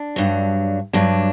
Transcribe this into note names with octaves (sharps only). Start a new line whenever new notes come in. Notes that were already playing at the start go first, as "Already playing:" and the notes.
Already playing: D4
G2 F#3
G2 F#3 D4